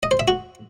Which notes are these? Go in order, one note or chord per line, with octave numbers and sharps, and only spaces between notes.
D#5
C5
E5
F#4